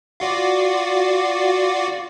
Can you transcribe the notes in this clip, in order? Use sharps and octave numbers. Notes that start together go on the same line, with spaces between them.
F4 F#4 D5